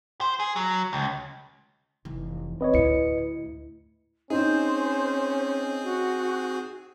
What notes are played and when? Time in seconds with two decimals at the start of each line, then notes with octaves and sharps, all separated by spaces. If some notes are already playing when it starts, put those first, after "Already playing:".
0.21 C5
0.40 G#4
0.56 F#3
0.93 C#2
2.05 F1 E3
2.61 C4 B4 C#5 D#5
2.74 D2 A2 E4 C#7
4.30 C4 C#4 D#4 G#4 C5
5.84 F#4